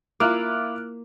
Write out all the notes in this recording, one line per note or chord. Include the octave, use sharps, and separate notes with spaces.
A#3 E4 F4 D6 F6 F#6